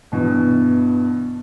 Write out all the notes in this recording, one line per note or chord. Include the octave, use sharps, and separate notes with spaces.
G2 B2 E3